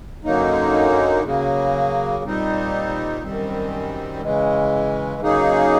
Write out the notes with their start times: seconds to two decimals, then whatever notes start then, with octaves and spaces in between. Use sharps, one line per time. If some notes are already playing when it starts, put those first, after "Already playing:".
0.24 F#2 D3 F#3 A#3 D#4
1.24 C#3 F#3 A#3
2.24 A#2 G3 C4 D#4
3.22 F#2 D#3 G3 C4
4.22 C#3 E3 G#3
5.21 C#3 F#3 A#3 D#4 G#4